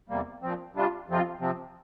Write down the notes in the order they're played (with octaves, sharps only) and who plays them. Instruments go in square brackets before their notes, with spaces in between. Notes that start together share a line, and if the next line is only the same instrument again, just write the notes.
[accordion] E2 C3 G3 A#3
A#2 F3 C4
C3 G3 D4 F4
F2 C3 F3 C4 F4
C3 F3 C4